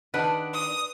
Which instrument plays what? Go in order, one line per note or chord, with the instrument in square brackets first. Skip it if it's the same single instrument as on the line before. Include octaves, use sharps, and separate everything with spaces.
[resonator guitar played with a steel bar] D#3 D4 F#5 [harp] B4
[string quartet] D#6